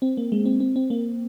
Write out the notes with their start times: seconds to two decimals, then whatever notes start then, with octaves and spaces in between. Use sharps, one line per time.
0.02 C4
0.17 A#3
0.32 G#3
0.45 C4
0.60 C4
0.76 C4
0.90 A#3